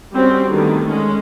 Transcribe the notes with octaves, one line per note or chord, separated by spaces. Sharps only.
G3 C4 C#4 F#4
D3 D#3 G3 A3 B3
G#3 C#4